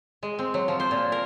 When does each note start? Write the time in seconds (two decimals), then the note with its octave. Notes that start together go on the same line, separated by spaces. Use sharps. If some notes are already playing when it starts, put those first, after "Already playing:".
0.23 G#3
0.39 C4
0.54 F#3
0.68 F3
0.80 C5
0.91 A#2
1.12 A#4